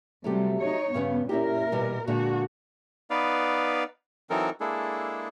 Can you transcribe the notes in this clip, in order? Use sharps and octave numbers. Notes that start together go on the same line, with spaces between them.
C3 F#3 G3 A3 G4
D#4 C#5
G2 C#3 B3 C#4
A#2 C#4 E4 G4 A#4
B2 E3 G3
A#2 D3 G#3 F#4
B3 D#4 B4 D5 F5
E3 F#3 C4 D#4 A4 A#4
G#3 A#3 D4 E4 G#4 A4